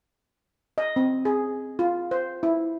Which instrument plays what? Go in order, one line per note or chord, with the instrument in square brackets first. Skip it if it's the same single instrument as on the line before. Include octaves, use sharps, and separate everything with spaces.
[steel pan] D#5
C4
G#4
F4
C5
E4